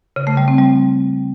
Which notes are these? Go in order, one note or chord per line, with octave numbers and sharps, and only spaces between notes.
C#3
A3
G3
C4
G3